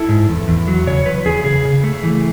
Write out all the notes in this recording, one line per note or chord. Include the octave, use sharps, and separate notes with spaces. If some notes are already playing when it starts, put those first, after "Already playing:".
Already playing: E4 A4
G#2
E2
E2
F#3
C#3 C#5
E2 B4
E2 G#4
C#3 G#4
C#3
A3
E3